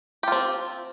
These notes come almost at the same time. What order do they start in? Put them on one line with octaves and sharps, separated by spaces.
G4 F4 C4